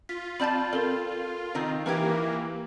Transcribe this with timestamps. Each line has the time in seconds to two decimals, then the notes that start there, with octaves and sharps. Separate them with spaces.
0.09 F4 B6
0.40 C4 D5 A5 B5 G6 A6
0.73 C4 A4 A#4
1.55 D#3 C4 D#4
1.86 E3 A#3 G4 A#4 B4 G#6